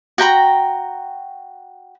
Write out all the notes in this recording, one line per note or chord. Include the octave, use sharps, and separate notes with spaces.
F#4 G5 A#5 B5